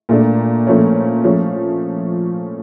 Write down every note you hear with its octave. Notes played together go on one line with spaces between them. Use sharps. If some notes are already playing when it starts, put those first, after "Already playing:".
A#2 A3 D4
A#2 F3 A3 C#4
F3 A3 C#4